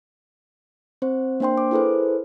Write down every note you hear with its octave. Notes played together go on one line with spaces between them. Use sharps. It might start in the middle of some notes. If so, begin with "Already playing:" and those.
C4 C5
A#3 D4 C5 G5 C6
D6
E4 G#4 A4 B4 C5